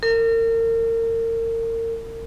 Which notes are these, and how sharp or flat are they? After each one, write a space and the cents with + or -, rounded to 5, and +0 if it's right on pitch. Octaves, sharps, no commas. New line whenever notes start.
A#4 -35